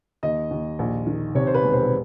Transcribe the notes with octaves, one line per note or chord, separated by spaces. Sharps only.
D#2 D#5
D#2
A#1
D#3
C3 C#5
C5
B4
E1
C5
B4